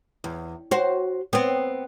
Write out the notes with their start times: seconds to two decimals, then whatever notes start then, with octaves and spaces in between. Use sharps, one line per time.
0.24 E2
0.71 F#4 C5
1.33 B3 C4